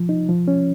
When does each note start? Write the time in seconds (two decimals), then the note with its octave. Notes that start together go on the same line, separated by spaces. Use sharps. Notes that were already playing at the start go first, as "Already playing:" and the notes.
Already playing: F3
0.09 D#4
0.29 F3
0.48 C#4